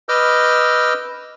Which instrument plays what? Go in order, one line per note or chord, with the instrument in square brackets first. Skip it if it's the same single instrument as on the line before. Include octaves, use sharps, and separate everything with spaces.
[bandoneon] B4 D#5 D6 E6 F6 G6